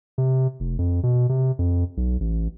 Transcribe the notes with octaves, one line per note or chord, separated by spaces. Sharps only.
C3
F1
F2
B2
C3
F2
B1
A1